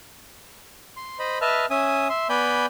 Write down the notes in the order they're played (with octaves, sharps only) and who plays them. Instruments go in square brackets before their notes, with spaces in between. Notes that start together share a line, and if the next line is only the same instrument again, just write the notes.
[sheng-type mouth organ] C6
C5 D#5 B5
B4 D#5 E5 A5 F6
C#4 E5 G#5 D#6
E5 C6
B3 D5 G#5 B5 G6